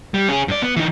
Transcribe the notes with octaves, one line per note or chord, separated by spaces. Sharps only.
G3
C#4 G#4
G2 D5
B3
E3 D#4